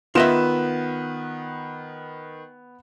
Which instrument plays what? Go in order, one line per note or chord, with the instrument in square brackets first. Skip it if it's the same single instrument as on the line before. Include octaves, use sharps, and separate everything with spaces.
[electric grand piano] D#3 B4 [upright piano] B3 E7 [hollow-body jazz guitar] F4 D#5 E5